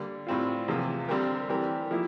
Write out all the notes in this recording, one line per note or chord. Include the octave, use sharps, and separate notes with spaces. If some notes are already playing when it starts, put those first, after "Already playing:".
Already playing: D3 G3 A#3
A2 G3 C4 F4
E2 C3 F3 A#3 F4
D3 G3 C4 G4 A#4
E3 G3 C4 G4 A#4
F3 A#3 E4